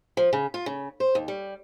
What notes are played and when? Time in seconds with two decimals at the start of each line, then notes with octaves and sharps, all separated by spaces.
0.17 F3
0.33 C#3
0.54 F4
0.66 C#3
1.00 C5
1.15 D#2
1.28 G3